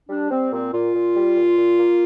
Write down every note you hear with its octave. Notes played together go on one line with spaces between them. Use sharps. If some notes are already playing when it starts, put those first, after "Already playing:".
G3 D4
G3 C4
A#2 C4
A#2 F4
A#2
G3
A#2
A#2
A#3